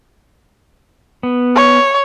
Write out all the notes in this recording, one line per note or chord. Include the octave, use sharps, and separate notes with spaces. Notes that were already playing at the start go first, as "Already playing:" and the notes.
B3
C#5